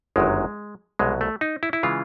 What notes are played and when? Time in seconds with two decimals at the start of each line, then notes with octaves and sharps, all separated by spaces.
0.16 G1 F#2 D#3 F#3 G#3
0.99 C2 B2 F#3 G#3
1.21 A3
1.41 D#4
1.63 E4
1.73 E4
1.83 C#3 E3 G#3 F4